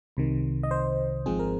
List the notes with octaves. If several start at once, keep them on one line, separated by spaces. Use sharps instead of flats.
C2 C3 D#3
D#5
C5
G#1 G#2 F3 G#3 C4 G#4
A#4